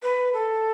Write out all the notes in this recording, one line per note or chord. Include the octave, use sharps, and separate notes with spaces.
B4
A4